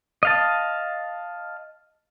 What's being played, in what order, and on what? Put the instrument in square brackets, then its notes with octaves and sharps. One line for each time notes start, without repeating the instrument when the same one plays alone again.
[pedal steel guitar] D#5 F5 A5